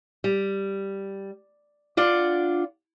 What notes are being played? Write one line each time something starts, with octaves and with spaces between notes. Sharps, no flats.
G3
D4 F4 D5 F#5